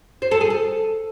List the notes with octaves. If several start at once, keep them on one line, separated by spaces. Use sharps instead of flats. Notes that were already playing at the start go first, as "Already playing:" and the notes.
C5
A4
G#4
A4